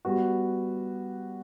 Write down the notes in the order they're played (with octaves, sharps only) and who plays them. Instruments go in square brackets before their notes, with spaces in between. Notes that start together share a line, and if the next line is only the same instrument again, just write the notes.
[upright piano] G3 B3 F#4